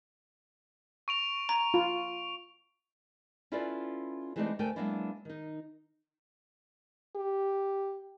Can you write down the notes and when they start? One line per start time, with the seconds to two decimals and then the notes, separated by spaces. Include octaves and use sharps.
1.08 C#6 D7 F7
1.49 A#5
1.74 F4
3.52 C#4 E4 F4 A4 B4 D5
4.36 E3 G#3 A3 C4 D#4 D5
4.59 D2 A3 A#4 D5 G5 G#5
4.76 F#3 G#3 A#3 B3 D4 E4
5.25 D#3 D#4
7.16 G4